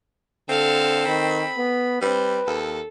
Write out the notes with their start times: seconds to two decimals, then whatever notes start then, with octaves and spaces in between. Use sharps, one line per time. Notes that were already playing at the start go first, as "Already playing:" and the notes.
0.49 D3 C4 A4 F5
1.07 D#3 B5
1.58 B3
2.02 G3 C4 B4
2.47 D#2 A4